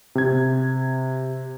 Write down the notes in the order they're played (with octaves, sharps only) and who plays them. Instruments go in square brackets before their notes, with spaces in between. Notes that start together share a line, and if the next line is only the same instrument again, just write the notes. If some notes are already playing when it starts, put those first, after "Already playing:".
[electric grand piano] C3 G#6